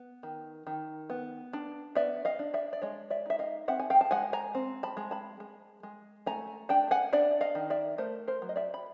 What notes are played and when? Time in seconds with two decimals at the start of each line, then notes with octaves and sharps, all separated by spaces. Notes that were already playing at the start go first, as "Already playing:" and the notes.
Already playing: B3
0.23 D#3
0.67 D#3
1.10 B3
1.53 D4
1.95 B3 D5 E5
2.25 D#5 F5
2.39 D4
2.54 D5 E5
2.73 D5
2.82 G#3 C#5 D#5
3.10 D5 E5
3.26 D#4 E5
3.39 D#5 F5
3.68 C4 E5 F#5
3.80 G#5
3.90 F5 G5
4.01 A5
4.11 G#3 F#5 G#5
4.33 G#5 A#5
4.55 C4
4.83 A5 B5
4.97 G#3
5.11 A5 B5
5.40 G#3
5.83 G#3
6.26 A3 G#5 A#5
6.69 D4 G5 A5
6.91 F#5 G#5
7.13 D4 D5 E5
7.41 D#5 F5
7.55 D#3
7.70 D5 E5
7.98 A3 A#4 C5
8.27 A#4 C5
8.42 F#3
8.49 D#5
8.56 D5 E5
8.74 B5